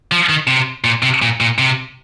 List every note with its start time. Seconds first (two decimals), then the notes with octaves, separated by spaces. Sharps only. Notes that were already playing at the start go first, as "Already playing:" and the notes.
0.12 F3
0.29 D#3
0.47 C3
0.84 A#2
1.03 C3
1.22 A#2
1.41 A#2
1.59 C3